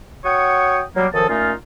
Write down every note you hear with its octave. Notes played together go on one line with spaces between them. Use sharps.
F#4 C#5 F#5 G5 C#6 D#6
F#3 G3 A#3
F#2 D#3 F3 A4 A5 D#6
A#2 A3 C#4 D#4 F4